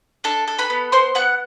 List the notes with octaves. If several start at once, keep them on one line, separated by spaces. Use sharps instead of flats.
D4 A4 A5
A4
B4 B5
B3
B3 C5 C6
B3 F#5 F#6